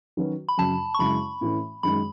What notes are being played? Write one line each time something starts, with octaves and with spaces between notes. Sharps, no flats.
D#3 F#3 C#4 F#4 B4
B5
F#2 C#3 F#3 A5
C#6
F#2 C#3 G#3 C#4 E4 B5
A2 E3 A3 C#4
F#2 D#3 G#3 B5